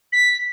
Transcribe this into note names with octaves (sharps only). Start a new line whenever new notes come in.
B6